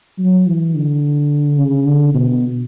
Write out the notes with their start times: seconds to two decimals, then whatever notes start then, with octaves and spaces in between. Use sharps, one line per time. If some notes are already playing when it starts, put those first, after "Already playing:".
0.19 F#3
0.46 E3
0.75 D3
1.58 C#3
1.86 D3
2.15 B2